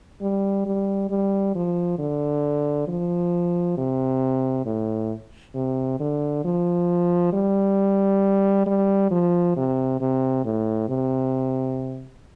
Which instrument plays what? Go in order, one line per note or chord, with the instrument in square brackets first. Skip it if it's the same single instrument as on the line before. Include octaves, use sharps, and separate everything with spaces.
[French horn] G3
G3
G3
F3
D3
F3
C3
A2
C3
D3
F3
G3
G3
F3
C3
C3
A2
C3